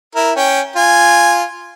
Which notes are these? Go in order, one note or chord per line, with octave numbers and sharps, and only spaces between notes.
E4 A#4
C#4 G5
F4 G#5